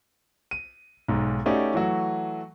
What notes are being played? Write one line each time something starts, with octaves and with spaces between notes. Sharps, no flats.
D#7
B1 G#2
A3 C#4 D#4 F#4 G4 D5
E3 F#3 A3 F#4